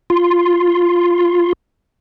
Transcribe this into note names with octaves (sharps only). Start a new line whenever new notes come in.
F4 C6